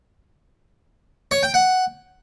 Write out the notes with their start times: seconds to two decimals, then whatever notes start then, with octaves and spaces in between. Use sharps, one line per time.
1.31 C#5
1.43 G5
1.54 F#5